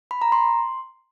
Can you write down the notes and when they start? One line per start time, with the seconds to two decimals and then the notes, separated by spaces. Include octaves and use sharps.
0.11 B5
0.22 A#5
0.32 C6